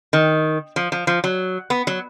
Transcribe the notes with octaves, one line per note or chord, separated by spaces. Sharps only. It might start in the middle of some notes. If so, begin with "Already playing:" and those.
D#3
F3
F3
F3
F#3
B3
F#3